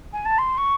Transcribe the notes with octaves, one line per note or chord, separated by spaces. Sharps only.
G#5
A5
C6
C#6